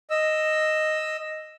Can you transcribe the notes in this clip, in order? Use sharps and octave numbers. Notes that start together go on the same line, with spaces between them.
D#5 E6